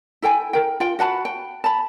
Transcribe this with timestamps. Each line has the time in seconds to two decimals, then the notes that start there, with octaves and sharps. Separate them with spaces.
0.22 E4 A4 G5 G#5
0.53 A#4 G5
0.80 F4 G5
0.99 F#4 F#5 A5 B5
1.25 G5
1.64 A5 B5